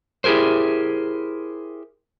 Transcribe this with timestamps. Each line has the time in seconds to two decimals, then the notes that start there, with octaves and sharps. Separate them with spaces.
0.24 E4 G4 G#4 A#4 C5